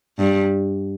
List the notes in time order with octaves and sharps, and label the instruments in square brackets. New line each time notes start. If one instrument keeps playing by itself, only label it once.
[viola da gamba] G2